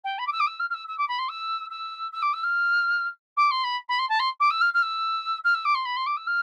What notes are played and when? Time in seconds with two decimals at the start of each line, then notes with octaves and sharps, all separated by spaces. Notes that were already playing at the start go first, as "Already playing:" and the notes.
0.04 G5
0.18 B5
0.26 D6
0.32 E6
0.39 D6
0.46 E6
0.59 F6
0.70 F6
0.74 E6
0.87 E6
0.98 D6
1.08 B5
1.18 C6
1.28 E6
1.70 E6
2.12 E6
2.22 D6
2.33 E6
2.43 F6
3.37 D6
3.51 C6
3.63 B5
3.88 B5
3.98 C6
4.09 A5
4.19 C6
4.40 D6
4.50 E6
4.61 F6
4.73 F6
4.82 E6
5.44 F6
5.54 E6
5.65 D6
5.74 C6
5.85 B5
5.96 C6
6.06 D6
6.16 E6
6.27 F6